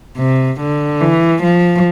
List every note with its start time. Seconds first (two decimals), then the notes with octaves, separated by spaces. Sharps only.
0.18 C3
0.60 D3
1.01 E3
1.43 F3